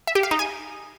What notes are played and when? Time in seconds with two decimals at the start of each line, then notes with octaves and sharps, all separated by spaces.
0.07 E5
0.15 G4
0.23 F5
0.31 D#4
0.39 G#5